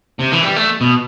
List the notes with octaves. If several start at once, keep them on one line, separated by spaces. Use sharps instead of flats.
C3
E3
G3
A3
B2